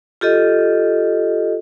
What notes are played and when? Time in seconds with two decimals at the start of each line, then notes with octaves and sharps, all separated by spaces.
0.21 F4 G4 A4 D#5